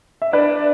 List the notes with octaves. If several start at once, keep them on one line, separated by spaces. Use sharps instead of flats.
E5
D4 B4 D5